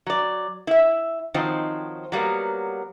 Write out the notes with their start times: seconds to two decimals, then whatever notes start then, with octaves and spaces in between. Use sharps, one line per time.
0.06 F#3 D5
0.67 E4 E5
1.34 D#3 F3 F#3 C4 D#4
2.12 F#3 G3 A#3 B3